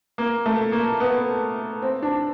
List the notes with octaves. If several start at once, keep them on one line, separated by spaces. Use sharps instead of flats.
A#3
A3
A#3
B3
C4
D4